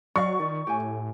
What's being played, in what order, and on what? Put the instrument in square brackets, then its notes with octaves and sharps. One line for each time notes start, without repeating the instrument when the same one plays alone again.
[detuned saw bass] F#3 [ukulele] D5 D#5 F5 [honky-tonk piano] C#6
[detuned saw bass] D#3 [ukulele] F4 D5
[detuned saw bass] A2 [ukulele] G4 G#5